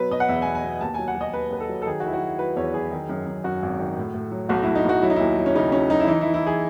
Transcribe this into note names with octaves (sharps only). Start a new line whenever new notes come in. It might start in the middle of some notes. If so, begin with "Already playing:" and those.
Already playing: B2 F#3 B4
B2 D#5
F#5
E2 E5
G#5
B2
G#5
B2
D#2 A5
F#3 G#5
F#5
F#3
D#5
D#2 B4
D#2 B4
A4
F#3
A4
D#3 G#4
F#4
D#3 E4
F#4
F#3
F#3 B4
E2 C#5
F#3 G#4
D#3
F#2
F#2
F#2 F#4
G#1
D#3
A2
A2
F#3
B1 F#4
B1 E4
D#4
B1 F#4
F#3 E4
D#4
D#2 E4
F#3
C#4
C#3 D#4
F#3 C#4
F#3 D#4
E4
E3 D#4
E3 E4
E4
E3 G#4